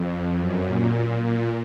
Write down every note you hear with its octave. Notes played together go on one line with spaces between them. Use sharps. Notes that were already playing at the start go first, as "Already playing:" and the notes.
Already playing: F2
F#2
A#2
A#2